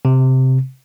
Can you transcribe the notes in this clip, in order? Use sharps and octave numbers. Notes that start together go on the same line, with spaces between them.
C3